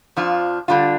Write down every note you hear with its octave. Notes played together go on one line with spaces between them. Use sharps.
F2 F3 D4 F4
D3 G3 D4 F4